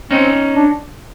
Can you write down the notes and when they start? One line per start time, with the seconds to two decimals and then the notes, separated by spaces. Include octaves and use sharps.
0.11 C4 C#4 D#4
0.55 D4